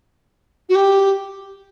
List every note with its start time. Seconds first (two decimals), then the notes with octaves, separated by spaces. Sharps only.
0.69 F#4
0.75 G4